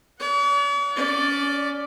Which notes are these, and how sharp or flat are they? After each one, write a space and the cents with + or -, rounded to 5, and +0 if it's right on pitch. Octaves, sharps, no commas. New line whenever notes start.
C#5 +45 F#5 +0
C#4 +25 D5 +0